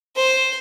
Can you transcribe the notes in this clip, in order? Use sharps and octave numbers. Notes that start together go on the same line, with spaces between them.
C5